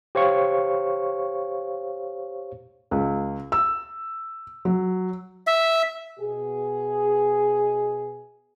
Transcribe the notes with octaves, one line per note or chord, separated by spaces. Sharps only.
G4 C5 C#5 F5 C#6
C#2
E6
F#3
E5
B2 G#4